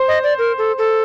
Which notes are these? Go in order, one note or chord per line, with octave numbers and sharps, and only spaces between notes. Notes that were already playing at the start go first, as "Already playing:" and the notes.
Already playing: C5
D#5
D5
A#4
A4
A4